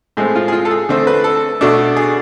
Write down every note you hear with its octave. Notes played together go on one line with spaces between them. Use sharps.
A2 G#3 C4 G#4
F4
G#4
F4
A4
G#4
D3 A3 C4
B4
A4
B2 A3 D4
G#4